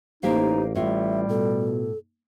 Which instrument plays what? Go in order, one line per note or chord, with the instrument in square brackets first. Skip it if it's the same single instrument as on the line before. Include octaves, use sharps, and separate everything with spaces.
[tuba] A1 [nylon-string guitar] A#3 G4 F5 [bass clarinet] D#4 [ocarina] C5
[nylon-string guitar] A2 F4 [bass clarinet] G3 [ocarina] E5
[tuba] B2 [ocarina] A4